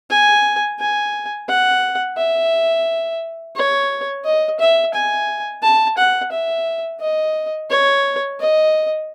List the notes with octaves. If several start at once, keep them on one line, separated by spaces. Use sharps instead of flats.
G#5
G#5
F#5
E5
C#5
D#5
E5
G#5
A5
F#5
E5
D#5
C#5
D#5